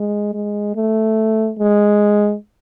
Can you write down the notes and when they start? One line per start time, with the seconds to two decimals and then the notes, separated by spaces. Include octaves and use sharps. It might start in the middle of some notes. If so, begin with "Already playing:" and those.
Already playing: G#3
0.33 G#3
0.75 A3
1.59 G#3